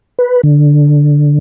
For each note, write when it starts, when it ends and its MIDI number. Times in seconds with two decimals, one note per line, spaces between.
0.19 0.41 71
0.43 1.39 50